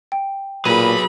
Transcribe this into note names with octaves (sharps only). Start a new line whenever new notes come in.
G5
A#2 F#3 G#4 B4 B5 D#7